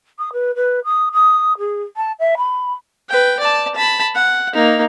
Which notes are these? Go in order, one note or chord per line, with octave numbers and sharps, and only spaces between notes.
D#6
B4
B4
D#6
D#6
G#4
A5
E5
B5
B4 G5
D5 A5
A5 B5
F#5
A#3 D#4